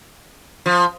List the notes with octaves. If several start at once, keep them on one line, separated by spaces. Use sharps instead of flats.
F3